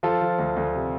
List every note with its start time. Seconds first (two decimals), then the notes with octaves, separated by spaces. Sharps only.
0.03 F3 F4 A4
0.21 F3
0.39 D2
0.56 D2
0.75 C3